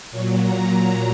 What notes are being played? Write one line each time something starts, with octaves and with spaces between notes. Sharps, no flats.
A#2 F#3 C#5
A#5